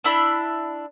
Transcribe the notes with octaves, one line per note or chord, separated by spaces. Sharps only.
D4 E4 B5